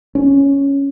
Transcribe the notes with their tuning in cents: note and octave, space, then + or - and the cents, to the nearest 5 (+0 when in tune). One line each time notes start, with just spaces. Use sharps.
C#4 +0